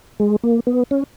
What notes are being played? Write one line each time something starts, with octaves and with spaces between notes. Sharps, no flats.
G#3
A#3
B3
C#4